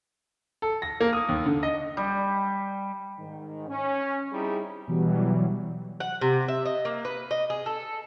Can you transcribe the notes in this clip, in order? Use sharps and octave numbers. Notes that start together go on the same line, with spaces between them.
A4
A#6
A#3
D#6
D#2
D3
D#5
G3
G#2 D#3
C#4
G3 C4 D#4 E4 G#4
B2 E3 F#3 G3
F#5
C3
E5
D#5
A#3
B4
D#5
G#4
A4